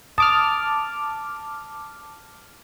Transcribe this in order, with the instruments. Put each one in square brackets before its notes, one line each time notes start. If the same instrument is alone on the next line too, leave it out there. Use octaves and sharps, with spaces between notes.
[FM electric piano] A5 D6 F6 [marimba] D#6